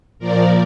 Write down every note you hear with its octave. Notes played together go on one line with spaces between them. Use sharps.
A#2 F3 A#4 D5